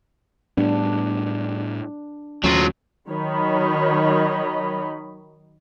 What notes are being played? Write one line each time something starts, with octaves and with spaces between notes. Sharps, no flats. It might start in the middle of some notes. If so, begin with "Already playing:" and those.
A2 G3 B3 D4
D#2 F#3 A3 C#4 F4
D#3 F#3 C#5 D#5 B5